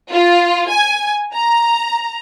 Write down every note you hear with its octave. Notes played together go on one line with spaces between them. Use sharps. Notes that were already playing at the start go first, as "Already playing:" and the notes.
F4
G#5
A#5